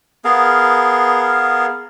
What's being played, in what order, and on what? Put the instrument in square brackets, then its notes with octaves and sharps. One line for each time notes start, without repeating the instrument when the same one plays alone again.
[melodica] B3 G#4 A#4 F5